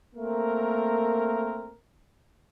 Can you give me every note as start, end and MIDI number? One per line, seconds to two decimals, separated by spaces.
0.15 1.76 57
0.15 1.76 58
0.15 1.76 60
0.15 1.76 70